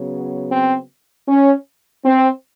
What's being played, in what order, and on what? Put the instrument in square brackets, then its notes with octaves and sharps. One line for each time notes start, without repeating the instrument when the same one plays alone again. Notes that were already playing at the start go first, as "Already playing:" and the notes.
Already playing: [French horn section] C#3 F#3 B3
C4
C#4
C4